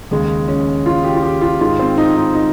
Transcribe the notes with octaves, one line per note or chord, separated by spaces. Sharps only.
D#2 C#3 G#3
C#4
F4
G4
F4
G4
F4
G#2 D#3 G#3 F4
C4
D#4
D#4
D#4